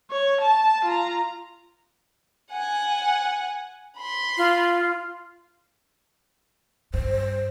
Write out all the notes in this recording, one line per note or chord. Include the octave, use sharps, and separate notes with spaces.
C#5
A5
F4 A#5
F#5 G#5
B5 C6
F4
G2 C5